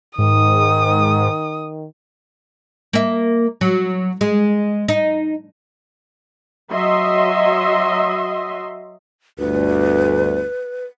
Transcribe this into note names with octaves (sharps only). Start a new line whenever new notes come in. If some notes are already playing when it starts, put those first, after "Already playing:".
G#2 D#3 D#6
A#3 E5
F#3
G#3
D#4
F#3 D#5 E5 C6
G1 D2 B4